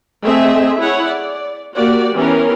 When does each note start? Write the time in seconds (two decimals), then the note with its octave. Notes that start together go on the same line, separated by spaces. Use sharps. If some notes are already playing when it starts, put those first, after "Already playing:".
0.23 A3 C4 G#4 D#5 E5
0.77 E4 G#4 C#5 F#5
1.07 D5
1.76 A#3 F#4 G4 D5
2.14 E3 B3 C#4 G4 A#4